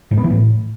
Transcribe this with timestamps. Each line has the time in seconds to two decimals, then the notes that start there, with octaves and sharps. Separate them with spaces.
0.11 G#2
0.18 B3
0.24 E3
0.30 A2